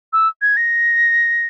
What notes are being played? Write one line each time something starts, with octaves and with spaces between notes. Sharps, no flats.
E6
G#6
A#6